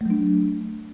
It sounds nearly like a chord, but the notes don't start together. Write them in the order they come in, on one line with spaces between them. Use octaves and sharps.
A3 F#3 D4